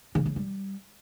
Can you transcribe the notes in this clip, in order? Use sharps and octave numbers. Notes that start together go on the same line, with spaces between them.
C#3
C#3
G3